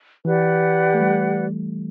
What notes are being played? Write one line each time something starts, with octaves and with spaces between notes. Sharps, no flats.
E3 G4 B4 D5 F#5
A3
G3